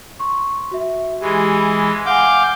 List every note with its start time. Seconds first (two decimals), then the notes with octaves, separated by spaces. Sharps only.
0.19 C6 C#6
0.71 F#4 E5
1.21 E3 G#3 G4
1.60 B5
2.06 F5 F#5 G#5 D6 G6